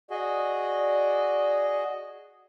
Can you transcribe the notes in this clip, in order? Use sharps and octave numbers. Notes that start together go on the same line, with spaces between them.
F#4 G#4 D5 D#5